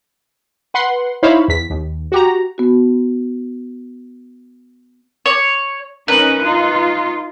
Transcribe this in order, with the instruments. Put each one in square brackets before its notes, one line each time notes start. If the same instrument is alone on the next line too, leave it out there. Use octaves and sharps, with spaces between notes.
[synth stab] B4 F#5 C6
D#4 E4 C5 C#5 F5 B5
E2 B6
D#2
F#4 G4 A#5
[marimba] B3 F#4
[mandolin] C#5
[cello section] C#4 D#4 A#4 [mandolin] B4
[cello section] D#4 F4